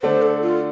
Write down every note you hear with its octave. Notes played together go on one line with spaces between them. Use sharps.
D3 A3 D4 C5
A4
F4